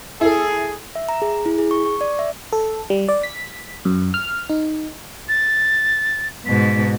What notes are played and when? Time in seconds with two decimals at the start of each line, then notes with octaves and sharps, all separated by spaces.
0.21 E4 G#4 A4
0.95 E5
1.09 A#5
1.22 G#4
1.46 E4
1.58 G#4
1.71 C#6
1.86 C#6
2.01 D5
2.19 E5
2.52 A4
2.90 G3
3.09 D5
3.23 B6
3.85 F#2
4.14 F6
4.50 D#4
5.29 A6
6.46 G#2 B2 B6